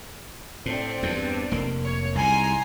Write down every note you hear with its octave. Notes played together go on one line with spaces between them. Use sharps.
A2 C4 D4
E2 G2
F1 A#3
C#5
C2 G#2 G#5 A#5 C6